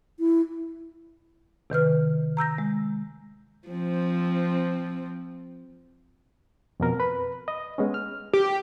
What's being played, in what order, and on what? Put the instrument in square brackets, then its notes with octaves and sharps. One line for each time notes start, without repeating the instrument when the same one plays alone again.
[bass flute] E4
[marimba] C3 D#3 B4 F6
A#5 E6 G6 A#6
G#3
[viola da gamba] F3 C4
[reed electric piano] F2 B2 A#4
B4 B5
D#5
G#3 B3 C#4
F6
[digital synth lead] G4